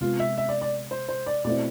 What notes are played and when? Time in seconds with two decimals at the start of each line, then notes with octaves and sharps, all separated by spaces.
0.01 C3 G#3 B3 F4
0.19 E5
0.38 E5
0.49 D5
0.61 D5
0.91 C5
1.09 C5
1.26 D5
1.44 B2 A3 C4 E4 D5